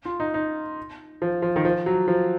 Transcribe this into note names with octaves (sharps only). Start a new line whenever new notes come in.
F4
D#4
D#4
F3
F3
D#3
F3
F#3
F3